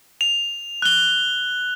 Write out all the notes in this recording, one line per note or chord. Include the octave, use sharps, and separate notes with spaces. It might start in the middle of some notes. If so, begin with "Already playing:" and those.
F7
F#6 G7